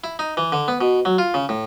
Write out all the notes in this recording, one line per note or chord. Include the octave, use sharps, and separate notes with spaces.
E4
D#4
E3
D3
B3
B2
F#3
F4
C#3
A2